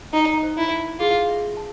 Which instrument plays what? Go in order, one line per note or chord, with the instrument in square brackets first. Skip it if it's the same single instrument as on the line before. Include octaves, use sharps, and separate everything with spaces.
[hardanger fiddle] D#4 [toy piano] E4
[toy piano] C5
[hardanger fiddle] E4
[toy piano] E4
[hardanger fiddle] F4 [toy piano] G#4
[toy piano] E5
A5